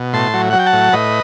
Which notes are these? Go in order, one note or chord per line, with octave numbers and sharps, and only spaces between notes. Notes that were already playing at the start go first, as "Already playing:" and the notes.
Already playing: B2
A2 A5 C6
F#3
F#3 F#5
G5
F#5 A5
A2
A2 B4 D#5